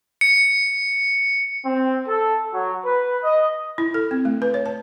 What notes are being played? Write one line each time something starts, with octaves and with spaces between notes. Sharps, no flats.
C#7
C4
A4
F#3
B4
D#5
E4
A4
C4
A3
B4
C#5
A5